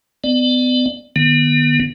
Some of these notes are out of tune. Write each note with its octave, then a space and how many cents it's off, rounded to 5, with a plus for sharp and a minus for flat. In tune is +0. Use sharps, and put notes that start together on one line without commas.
B3 +35 D5 +25
D3 +45 B3 -25